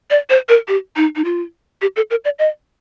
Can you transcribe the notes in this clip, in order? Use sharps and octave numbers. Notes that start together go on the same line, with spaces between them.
D5
C5
A#4
G4
D#4
D#4
F4
G4
A4
A#4
D5
D#5